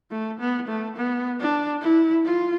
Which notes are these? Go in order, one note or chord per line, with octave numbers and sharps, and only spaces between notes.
A3
B3
A3
B3
D4
E4
F4